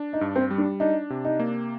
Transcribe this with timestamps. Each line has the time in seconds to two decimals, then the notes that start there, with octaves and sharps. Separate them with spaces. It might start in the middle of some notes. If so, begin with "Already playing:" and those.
Already playing: D4
0.13 D#4
0.21 G2
0.36 C4
0.51 G3
0.58 D4
0.80 D4 D#4
1.10 C3
1.25 D#4
1.40 A#3